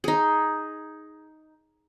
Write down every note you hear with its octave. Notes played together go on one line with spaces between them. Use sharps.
D#4 G#4